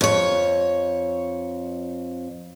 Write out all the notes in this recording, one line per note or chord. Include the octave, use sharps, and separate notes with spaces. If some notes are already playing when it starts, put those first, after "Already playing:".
F2 C#5